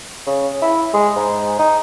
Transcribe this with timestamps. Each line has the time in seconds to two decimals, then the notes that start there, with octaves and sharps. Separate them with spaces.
0.27 C#3
0.62 E4
0.94 G#3
1.16 G#2
1.59 D#4